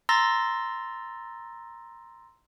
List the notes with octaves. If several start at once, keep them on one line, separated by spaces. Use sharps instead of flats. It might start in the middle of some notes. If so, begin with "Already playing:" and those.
A#5 C6 E6 A6 A#6